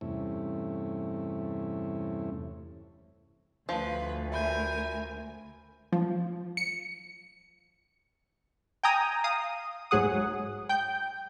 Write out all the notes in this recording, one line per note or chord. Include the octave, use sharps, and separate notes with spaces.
E2 G2 C3 A3 C#4 E4
D2 F3 B4
A#4 E5 G#5 B5 G6
F3
C#7
G5 G#5 A#5 D#6
F5 D#6
G#2 F#3 G#4 F#5 D#6
G5 G6